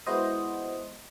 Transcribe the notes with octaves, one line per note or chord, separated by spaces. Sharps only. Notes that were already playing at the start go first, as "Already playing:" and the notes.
G#3 B3 E4 F#4 C5 D#5